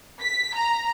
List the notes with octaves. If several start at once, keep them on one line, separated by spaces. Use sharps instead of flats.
B6
A#5